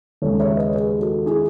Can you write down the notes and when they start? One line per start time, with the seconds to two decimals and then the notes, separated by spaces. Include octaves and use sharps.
0.22 D#2 C#3 G#3 A4 C#5
0.39 C#5 E5
0.56 B4 D#5
0.70 C#5
0.74 G#4 B4
1.00 F#4 A4
1.26 E4 G#4